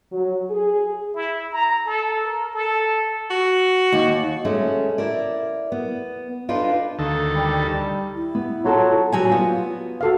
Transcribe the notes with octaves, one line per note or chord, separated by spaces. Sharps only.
F#3
G#4
E4
A#5
A4
A#4
A4
F#4
D#2
G#3 A3 C#4
E4 A#4 D5
B3
D4 D#4 F4 A4 B4
D2 D#3 A4
G3
E4
B3
F#3 F4 A4 A5
F#3 G3 G#5
B3 F4
F#4 A4 F5